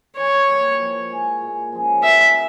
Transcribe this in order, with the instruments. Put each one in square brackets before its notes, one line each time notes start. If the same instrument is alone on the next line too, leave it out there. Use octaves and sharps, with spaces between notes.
[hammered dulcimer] E3 [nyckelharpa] C#5
[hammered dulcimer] G3 A#3 E4
F3
G#3 E4 G#4
A#2
F3 G#3 C#4
[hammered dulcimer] G3 [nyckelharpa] E5